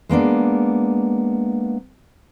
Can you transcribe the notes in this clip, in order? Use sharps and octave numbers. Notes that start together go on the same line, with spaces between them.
G#3 A#3 B3 D4